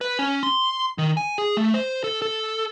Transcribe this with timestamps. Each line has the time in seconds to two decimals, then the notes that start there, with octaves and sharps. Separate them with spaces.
0.01 B4
0.19 C#4
0.43 C6
0.98 D#3
1.17 G#5
1.38 G#4
1.57 A3
1.74 C5
2.04 A4
2.22 A4